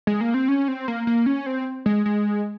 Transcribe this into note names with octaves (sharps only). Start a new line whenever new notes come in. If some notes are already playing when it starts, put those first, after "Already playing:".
G#3
A#3
C4
C#4
C4
A#3
A#3
C#4
C4
G#3
G#3